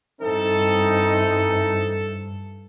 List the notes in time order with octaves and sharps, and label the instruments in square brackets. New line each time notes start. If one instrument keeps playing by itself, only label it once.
[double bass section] G2 [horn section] E3 C4 D#4 [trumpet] A4